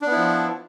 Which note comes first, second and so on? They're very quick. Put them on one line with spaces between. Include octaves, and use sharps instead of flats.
D4 B3 E4 F3